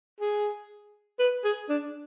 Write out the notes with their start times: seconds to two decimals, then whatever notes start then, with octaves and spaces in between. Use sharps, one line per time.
0.20 G#4
1.19 B4
1.44 G#4
1.69 D4